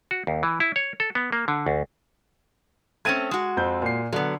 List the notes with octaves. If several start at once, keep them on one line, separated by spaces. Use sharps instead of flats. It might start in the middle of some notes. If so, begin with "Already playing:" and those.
F#4
D#2
E3
E4
C#5
A4
B3
A#3
D3
D2
A3 C4 C#4 G#6 D#7
G#3 F#4
F2 C4 G6
A#2 C7
D3 F#3 B3